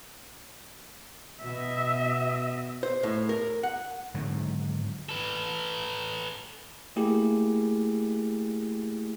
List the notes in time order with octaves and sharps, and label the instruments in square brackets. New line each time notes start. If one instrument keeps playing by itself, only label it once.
[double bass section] B2 [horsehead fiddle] D#5 E5
[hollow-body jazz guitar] C5
A2
A#4
F#5
[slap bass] G#2 D3 D#3 F#3
[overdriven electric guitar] A4 B4
[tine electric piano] A3 A#3 E4 G4 G#4